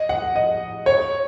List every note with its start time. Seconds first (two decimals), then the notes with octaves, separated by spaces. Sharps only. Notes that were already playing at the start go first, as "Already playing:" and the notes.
Already playing: D#5
0.09 F#5
0.36 D#5
0.86 C#5